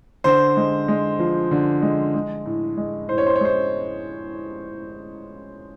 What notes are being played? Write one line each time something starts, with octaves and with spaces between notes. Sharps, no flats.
D3 C5
G#3
G#3
F3
D3
G#3
G#3
A2
G#3
A2 C5
C#5
C5
C#5
G#3 C5